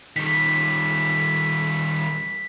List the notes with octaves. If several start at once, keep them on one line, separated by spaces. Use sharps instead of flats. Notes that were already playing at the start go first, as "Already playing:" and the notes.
D#3 G3 B6